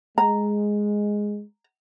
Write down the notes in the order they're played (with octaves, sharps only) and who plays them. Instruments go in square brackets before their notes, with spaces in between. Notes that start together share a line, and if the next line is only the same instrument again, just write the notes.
[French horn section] G#3 [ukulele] A#5